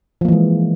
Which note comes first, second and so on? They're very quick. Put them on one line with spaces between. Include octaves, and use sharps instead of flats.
F3 A#3 E3 G#3